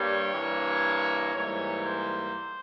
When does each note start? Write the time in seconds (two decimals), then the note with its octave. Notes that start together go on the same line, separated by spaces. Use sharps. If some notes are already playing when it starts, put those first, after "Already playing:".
Already playing: G2 G3 A#3 C#5
0.32 G2 E3 A#3
1.34 G#2 E3 G3 A#3 C#5
1.85 C5